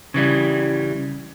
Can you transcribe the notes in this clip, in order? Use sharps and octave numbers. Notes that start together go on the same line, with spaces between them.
C#3 E3 G3